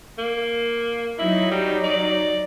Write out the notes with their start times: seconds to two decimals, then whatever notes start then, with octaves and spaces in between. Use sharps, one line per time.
0.18 A#3
1.19 F#3 D#4 E4
1.51 G3
1.84 D5